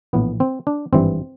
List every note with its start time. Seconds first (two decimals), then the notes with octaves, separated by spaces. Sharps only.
0.13 A#1 A2 E3 B3
0.40 C4
0.67 D4
0.92 G#1 G2 E3 C4